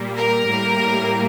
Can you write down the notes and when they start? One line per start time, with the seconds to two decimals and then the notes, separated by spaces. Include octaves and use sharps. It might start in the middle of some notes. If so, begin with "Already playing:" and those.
Already playing: A#2 G3 A#3
0.16 A#4
0.47 A2 G3 A#3